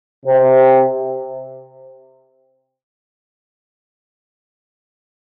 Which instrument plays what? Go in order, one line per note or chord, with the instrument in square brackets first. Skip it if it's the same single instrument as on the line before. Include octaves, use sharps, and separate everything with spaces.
[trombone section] C3